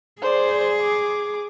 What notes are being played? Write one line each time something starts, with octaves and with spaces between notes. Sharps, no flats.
G#4 C5 D5
D6